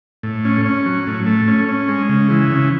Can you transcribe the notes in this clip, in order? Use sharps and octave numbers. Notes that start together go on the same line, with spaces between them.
A2
C#4
C#4
F#3
A2
A3
C#4
C#4
G#3
C#3
E3
C#3